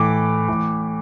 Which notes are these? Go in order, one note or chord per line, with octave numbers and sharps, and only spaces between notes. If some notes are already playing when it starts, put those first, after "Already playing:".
Already playing: A2 E3 D6
A2 E3